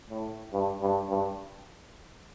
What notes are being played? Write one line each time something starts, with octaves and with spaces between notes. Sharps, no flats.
A2
G2
G2
G2